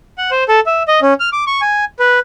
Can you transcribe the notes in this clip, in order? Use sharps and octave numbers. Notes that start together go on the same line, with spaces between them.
F#5
C5
A4
E5
D#5
C#4
F6
D6
C#6
G#5
B4